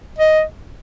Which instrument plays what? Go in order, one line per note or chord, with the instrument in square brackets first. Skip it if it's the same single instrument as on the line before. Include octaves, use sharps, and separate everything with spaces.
[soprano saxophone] D#5